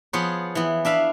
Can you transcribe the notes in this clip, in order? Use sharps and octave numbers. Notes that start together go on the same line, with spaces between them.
F3 B3 F4 G#4 B4 C#5
E3 B3
D4 E5 F5 B5